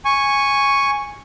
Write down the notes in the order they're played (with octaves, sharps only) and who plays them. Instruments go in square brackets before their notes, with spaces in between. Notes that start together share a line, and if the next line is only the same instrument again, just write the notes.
[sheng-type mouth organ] G#5 C#6